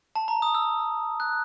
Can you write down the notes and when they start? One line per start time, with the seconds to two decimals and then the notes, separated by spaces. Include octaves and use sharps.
0.16 A5
0.28 A#5
0.42 D#6
0.55 E6
1.20 F#6